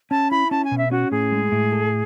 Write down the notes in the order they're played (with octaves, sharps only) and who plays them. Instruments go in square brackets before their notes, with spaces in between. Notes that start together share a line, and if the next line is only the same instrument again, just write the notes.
[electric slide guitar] C#4 [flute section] A5
[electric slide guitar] E4 [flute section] B5
[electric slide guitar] C#4 [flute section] A5
[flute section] G#5
[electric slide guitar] B2
[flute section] E5
[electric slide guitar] C#4 [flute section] F#4
[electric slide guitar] A2 [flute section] G#4
[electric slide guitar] G#3
A2
A4